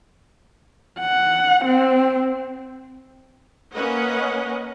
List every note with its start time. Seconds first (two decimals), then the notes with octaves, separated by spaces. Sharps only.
1.00 F#5
1.65 C4
3.73 A#3 C#4 B4 C#5 D#5 F#5